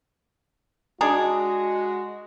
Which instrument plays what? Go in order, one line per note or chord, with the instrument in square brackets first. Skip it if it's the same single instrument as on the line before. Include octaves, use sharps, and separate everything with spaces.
[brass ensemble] G#3 F#4 [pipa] D4 D#4 G#4